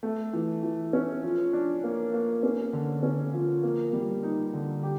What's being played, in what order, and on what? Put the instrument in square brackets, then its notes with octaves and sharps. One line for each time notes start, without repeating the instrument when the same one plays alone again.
[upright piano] A3
E3
E3
C#4
F3
D4
A#3
A#3
C#4
D3
C#4
F3
A#3
G3
D#4
D3
G4